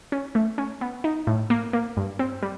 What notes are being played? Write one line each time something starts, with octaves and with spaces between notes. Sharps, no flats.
C#4
A3
C#4
B3
D#4
A2
A#3
A#3
G2
C4
G3